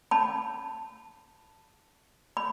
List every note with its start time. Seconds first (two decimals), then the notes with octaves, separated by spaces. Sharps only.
0.11 A5 B5
2.37 B5